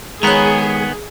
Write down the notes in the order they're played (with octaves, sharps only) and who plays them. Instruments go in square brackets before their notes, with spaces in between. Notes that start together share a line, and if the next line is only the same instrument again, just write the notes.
[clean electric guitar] D#3 B3 [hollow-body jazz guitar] G#3 C#5 [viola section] G#4 [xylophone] A#5 B5 F#6